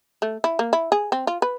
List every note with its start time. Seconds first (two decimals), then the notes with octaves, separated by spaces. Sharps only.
0.22 A3
0.44 E4
0.59 A#3
0.73 E4
0.92 G#4
1.12 C4
1.27 F4
1.42 B4